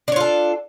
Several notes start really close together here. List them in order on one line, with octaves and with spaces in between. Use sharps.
D4 C#5 F4 A4